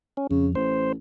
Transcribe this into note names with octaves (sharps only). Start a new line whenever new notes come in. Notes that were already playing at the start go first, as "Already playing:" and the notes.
C#4
F2 C#3
A1 C5